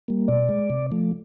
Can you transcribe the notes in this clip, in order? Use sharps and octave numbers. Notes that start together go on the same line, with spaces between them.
G3 A#3
B2 D5
G#3
C3
F3 A3